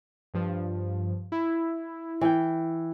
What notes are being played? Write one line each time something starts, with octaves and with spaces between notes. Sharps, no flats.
G2 F3
E4
E3 G5